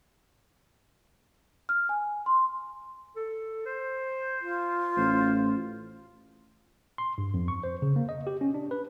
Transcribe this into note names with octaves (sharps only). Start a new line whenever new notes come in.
F6
G#5
C6
A4
C5
F4
A1 C5
C6
G2
F2
C#6
C5
C#3
A#3
D#5
G4
C#4
D4
B4